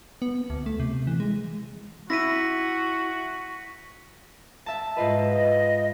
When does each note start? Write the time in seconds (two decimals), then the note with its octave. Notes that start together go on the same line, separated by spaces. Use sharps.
0.22 B3
0.50 D2
0.66 A3
0.80 C3
1.07 E3
1.20 G#3
2.10 E4 F#4 A#6 B6 D#7
4.66 E5 A5
4.97 G#2 F4 B4 D#5
5.28 D#5